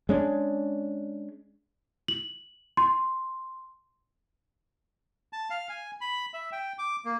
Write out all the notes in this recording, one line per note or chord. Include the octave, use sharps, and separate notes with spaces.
G#3 C#4 D4
F#7
C6
A5
F5
G#5
B5
E5
G5
D6
A#3